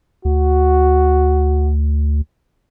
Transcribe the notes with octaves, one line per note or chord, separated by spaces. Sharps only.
D2 F#4